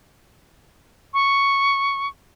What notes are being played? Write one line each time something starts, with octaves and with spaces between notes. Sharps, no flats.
C#6